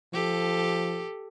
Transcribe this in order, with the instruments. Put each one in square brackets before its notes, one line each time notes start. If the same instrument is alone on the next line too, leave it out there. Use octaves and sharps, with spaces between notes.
[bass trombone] F3 [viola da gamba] G4 A4